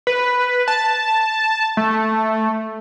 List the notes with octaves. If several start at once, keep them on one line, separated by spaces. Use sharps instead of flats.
B4
A5
A3